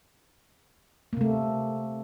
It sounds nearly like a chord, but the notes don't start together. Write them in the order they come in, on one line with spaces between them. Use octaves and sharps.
A#3 C3 A3